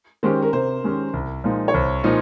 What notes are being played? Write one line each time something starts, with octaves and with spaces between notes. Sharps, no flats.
D#3 G#3 C#4 G4 C5
A#4
C3 C5
D#3 G#3 C#4 G4
C2
A#2 F3 G#3 D#4
C#5
C2 C5
A#2 F3 G#3 D#4